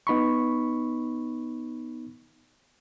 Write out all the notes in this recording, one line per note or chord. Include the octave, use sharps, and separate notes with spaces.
B3 D#4 B5 C#6